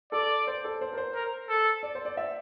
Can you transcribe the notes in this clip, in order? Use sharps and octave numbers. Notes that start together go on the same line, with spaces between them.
A4 D5
C5
A4
C5
A#4
C5
A#4
A4
D5
C5
D5
E5